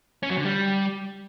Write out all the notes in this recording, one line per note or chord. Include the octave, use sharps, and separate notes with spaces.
C#4
F#3
D3
G3